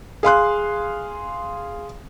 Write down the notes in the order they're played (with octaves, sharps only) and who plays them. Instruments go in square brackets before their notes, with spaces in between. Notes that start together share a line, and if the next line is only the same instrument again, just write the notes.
[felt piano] G#4 F5 C6 F#6